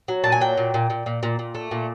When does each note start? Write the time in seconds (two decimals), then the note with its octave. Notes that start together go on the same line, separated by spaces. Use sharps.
0.08 F#3
0.24 A#2 A5
0.32 G#5
0.41 F#3 G5
0.57 A#2
0.74 A#2
0.90 A#2
1.06 A#2
1.23 A#2
1.39 A#2
1.55 A3
1.71 A#2